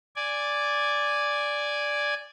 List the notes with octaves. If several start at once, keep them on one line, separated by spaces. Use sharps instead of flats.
D5 G#5